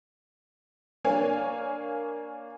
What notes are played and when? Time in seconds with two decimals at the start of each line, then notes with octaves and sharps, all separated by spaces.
1.05 A#3 D4 C#5 F5 G#5